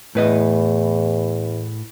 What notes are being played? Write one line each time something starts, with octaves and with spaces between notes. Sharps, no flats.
E2 A2 B4 D#5